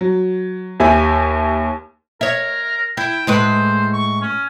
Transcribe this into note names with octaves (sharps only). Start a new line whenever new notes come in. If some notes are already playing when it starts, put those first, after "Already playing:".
F#3
D#2 G4 E5 G#5
A#4 C#5 E5
E4 G5
A2 G#3 B4 C5
C#6
C#4